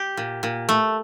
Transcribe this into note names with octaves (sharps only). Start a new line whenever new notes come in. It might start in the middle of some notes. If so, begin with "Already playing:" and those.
Already playing: G4
A#2
A#2
A3